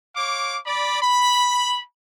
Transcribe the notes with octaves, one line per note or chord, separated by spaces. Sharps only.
C#5 F5 D6
D5 B5
B5